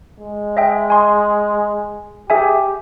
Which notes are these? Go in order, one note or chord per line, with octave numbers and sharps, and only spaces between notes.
G#3
D#5 E5 G5
G#5 C6
G4 G#4 E5 G#5